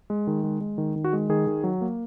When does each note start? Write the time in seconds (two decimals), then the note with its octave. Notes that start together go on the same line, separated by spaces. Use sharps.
0.10 G#3
0.27 D#3
0.44 G#3
0.61 G#3
0.78 D#3
0.96 D#3
1.04 F#4
1.13 G#3
1.29 D#3 G#4
1.47 D#3
1.64 F#3
1.81 A#3